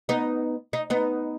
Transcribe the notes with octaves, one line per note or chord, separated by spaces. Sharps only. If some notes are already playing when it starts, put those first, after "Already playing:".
B3 D#4
D#4
B3 D#4